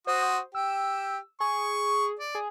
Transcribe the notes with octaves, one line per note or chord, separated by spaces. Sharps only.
F#4 C5 D#6
G4 E6
G#4 C#6
D5
G#4